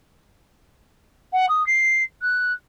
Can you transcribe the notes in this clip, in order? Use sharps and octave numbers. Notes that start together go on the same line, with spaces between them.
F#5
D#6
C7
F#6